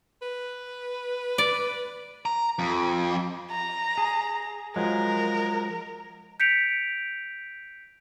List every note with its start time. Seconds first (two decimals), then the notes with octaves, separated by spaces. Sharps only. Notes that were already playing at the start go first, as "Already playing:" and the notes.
0.22 B4
1.38 D5
2.25 A#5
2.59 F2
3.51 A#5
3.98 G#4
4.76 F3 F#3 G#3 A#4
6.40 G6 B6 C#7 D7 F7